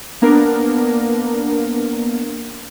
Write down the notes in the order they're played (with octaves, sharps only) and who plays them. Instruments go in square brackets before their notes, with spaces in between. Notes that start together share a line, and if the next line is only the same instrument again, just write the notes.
[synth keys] A#3 B3 D4 A#4